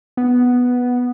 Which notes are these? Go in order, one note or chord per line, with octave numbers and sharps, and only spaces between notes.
B3